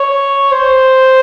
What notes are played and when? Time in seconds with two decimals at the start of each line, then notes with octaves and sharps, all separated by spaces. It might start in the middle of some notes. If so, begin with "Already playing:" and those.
Already playing: C#5
0.52 C5